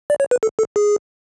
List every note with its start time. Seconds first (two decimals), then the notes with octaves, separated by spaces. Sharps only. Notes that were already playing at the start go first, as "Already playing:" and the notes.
0.10 D5
0.20 C#5
0.31 B4
0.43 A4
0.59 A4
0.76 G#4